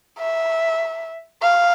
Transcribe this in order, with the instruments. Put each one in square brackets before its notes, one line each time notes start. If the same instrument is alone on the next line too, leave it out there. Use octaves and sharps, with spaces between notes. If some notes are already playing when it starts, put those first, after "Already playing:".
[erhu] E5
F5